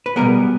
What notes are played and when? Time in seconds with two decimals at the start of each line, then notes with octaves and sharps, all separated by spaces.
0.06 B4
0.16 B2 G3 B3 G#4 A#4